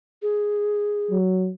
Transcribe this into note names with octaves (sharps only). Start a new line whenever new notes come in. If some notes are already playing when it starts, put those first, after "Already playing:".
G#4
F#3